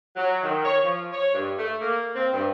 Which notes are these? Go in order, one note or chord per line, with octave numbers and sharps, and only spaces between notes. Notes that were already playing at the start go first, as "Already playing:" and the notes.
F#3
D#3
C#5
F3
C#5
G2
A3
A#3
C4
G2